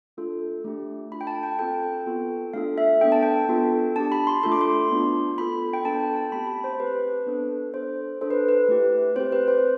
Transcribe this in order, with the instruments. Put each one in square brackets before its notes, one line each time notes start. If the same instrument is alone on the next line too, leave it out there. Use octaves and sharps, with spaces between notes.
[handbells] A3 D4 F4 A4
A3 D4 G4
D4 F4 A4 B5
G5
A5
G5
C4 F4 A4 G5
B3 F4 A4
A3 D4 F4 A4 F5
E5
B3 D4 A4 G5
A5
G5
B3 D4 F4 A4
D4 G4 A5
B5
C6
A3 D4 F4 A4 C6
D6
C6
B3 D4 F4
B3 F4 A4 B5
G5
B3 D4 A4 A5
G5
A5
A3 C4 G4 B5
B5
C5
C4 G4 B4
B3 D4 A4
D4 A4 C5
D4 A4 C5
B4
B4
A3 E4 G4
C4 G4 C5
B4
C5